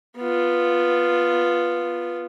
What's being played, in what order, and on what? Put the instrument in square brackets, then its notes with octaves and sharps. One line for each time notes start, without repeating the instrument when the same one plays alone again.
[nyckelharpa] B3 F4